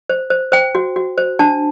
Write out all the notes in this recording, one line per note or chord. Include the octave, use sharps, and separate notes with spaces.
C5
C5
C5 G5
F#4
F#4
C5
D4 A5